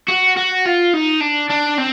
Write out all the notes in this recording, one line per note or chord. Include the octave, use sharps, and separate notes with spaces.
F#4
F#4
F4
D#4
D4
D4
C4